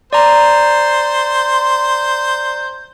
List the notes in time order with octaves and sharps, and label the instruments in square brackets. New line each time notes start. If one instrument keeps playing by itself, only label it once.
[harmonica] C5 [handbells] D5 A#5